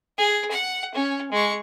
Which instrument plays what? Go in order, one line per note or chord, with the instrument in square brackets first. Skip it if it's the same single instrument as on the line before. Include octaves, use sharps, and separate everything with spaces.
[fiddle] G#4
F#5
C#4
G#3 C#6